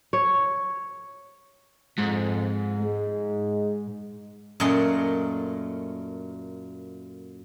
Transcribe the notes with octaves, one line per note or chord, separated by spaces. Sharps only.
C#5
F2 G#2
G#3
F#2 A#2 A3 D#5 C6